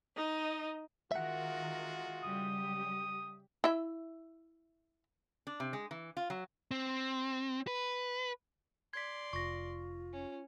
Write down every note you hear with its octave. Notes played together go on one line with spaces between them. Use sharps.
D#4 D#5
D#3 G#3 F4 F#4 A#4 E5 F#5
C#3 G3 G4 D#6
E4 E5
D4
C3
G#3
E3
F4
F#3
C4
B4
D5 C6 G#6 B6
F1 F4 C#6 A#6
C#4